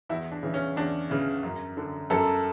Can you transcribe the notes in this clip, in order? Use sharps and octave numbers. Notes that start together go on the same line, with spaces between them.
E2 E4
D4
C#3 E3
C#4
E2 D4
C#3 E3
F#2
D3
F#2 A4